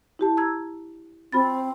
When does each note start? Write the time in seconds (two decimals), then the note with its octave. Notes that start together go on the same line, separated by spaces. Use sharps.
0.19 E4 G4 A5
0.37 A#5 E6 G#6
1.32 C4 F4 B5 A6